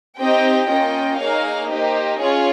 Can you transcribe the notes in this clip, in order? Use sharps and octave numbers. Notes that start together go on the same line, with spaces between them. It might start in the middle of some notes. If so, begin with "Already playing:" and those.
C4 D#4 G4 D#5 G5
A#3 C#4 F4 D#5 G5
A#3 D#4 G#4 C#5 F5
A#3 D#4 G4 C5 D#5
C#4 F4 G#4 C#5